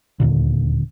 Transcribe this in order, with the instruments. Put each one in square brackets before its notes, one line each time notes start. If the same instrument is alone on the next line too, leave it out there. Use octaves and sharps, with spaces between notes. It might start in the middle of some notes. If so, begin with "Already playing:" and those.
[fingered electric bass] D1 D#2 A#2 D3